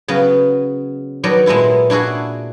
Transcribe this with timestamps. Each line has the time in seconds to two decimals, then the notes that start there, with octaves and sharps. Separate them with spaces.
0.08 C#3 F#3 B3
1.23 D#3 F#3 B3 A4 D5
1.46 A#2 G#3 B3 E4 A4
1.90 D4 E4 F#4 G#4 F#5